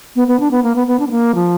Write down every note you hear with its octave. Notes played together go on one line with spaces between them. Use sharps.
B3
B3
D4
B3
A#3
B3
B3
D4
B3
A#3
F3